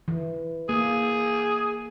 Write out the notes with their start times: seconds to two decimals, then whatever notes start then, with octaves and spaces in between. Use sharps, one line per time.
0.08 E3
0.69 A#3 G#4